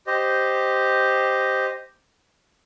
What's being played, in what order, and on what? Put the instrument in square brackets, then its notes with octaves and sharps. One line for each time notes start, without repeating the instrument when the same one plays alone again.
[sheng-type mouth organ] G4 C5 D#5